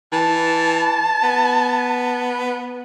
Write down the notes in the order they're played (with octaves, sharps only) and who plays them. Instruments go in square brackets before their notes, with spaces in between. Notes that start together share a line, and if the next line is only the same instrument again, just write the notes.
[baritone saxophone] E3 [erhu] A5
[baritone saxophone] B3